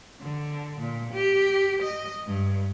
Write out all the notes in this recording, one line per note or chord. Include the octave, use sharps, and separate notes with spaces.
D3
A#2
G4
D#5
G2